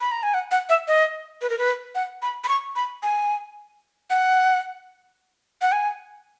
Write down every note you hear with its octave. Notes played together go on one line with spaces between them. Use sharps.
B5
A#5
G#5
F#5
F#5
E5
D#5
B4
A#4
B4
F#5
B5
B5
C#6
B5
G#5
F#5
F#5
G#5